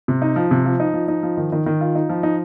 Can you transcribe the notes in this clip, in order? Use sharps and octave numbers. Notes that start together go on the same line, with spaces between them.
C3
D#4
F3
C3
F3
D#4
F3
D#4
F3
D#3
D#3
D#3
F4
D#4
F3
D#4